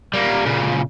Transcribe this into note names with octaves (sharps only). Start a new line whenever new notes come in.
G3 A#3
A#2 C#3